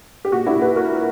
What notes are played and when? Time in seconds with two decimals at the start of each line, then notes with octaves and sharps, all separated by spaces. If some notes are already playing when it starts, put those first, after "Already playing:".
0.25 G4
0.32 A#2 F#4
0.47 E4 G4
0.55 A#2
0.62 G4 B4
0.76 A#3 F#4 A#4